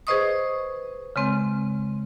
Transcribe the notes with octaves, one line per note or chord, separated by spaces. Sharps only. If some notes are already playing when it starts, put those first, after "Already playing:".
G#4 B4 C5 D#5 C#6 D#6
C#3 G#3 C4